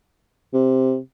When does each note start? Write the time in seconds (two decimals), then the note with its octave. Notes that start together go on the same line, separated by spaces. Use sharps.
0.53 C3